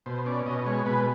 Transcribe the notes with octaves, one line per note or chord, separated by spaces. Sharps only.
B2 C5
C#4 D5
B2 D#5
G#3 C#5
B2 B4